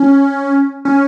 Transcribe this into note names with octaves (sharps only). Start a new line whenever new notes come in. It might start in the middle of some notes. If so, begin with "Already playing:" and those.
Already playing: C#4
C#4